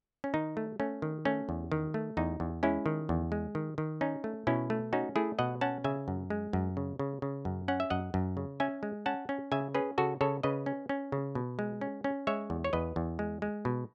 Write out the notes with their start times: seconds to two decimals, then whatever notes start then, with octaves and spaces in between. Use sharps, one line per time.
0.24 C#4
0.34 D#3 D#4
0.57 A3
0.80 A3 C#4
1.02 D#3
1.25 A3 C#4
1.49 E2
1.72 D#3
1.94 A3
2.17 E2 D#4
2.40 E2
2.63 G#3 C#4 E4
2.86 D#3
3.09 E2
3.32 G#3
3.55 D#3
3.78 D#3
4.01 C#4 D#4
4.24 A3
4.47 B2 C#4 E4
4.70 A3
4.93 C#4 D#4 F#4
5.16 A3 E4 G#4
5.39 B2 D#5 F#5
5.61 C#4 F#5 A5
5.84 C#3 E5 G#5
6.08 F#2
6.30 G#3
6.53 F#2
6.77 C#3
6.99 C#3
7.22 C#3
7.45 F#2
7.68 C#4 F#5
7.80 E5
7.90 F#2 D#5 F#5
8.14 F#2
8.37 C#3
8.60 C#4 E5 G#5
8.83 G#3
9.06 C#4 F#5 A5
9.29 C#4
9.52 C#3 E5 G#5
9.75 C#4 G#4 B4
9.98 C#3 F#4 A4
10.21 C#3 A4 C#5
10.43 C#3 B4 D#5
10.66 C#4
10.89 C#4
11.12 C#3
11.35 B2
11.59 G#3
11.81 C#4
12.04 C#4
12.27 G#3 C#5 E5
12.50 E2
12.64 C#5
12.73 E2 B4 D#5
12.96 E2
13.19 G#3
13.42 G#3
13.65 B2